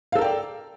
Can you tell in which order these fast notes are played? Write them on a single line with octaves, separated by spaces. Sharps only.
F5 A4 A#4 G5 D5